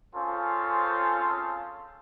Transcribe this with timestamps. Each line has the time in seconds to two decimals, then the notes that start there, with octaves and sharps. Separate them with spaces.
0.14 C4 C#4 F4 G#4 A4 C5